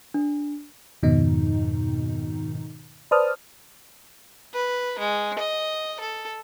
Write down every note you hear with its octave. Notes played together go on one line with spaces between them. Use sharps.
D4
F2 G#2 B2 D#3 D#4
B4 C5 D5 A5 D#6 F6
B4
G#3
D#5
A4